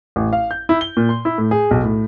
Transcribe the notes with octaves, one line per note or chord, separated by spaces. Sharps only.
A1
F5
G6
E4
G7
A#2
C6
E4
A2
G#4
B1
A2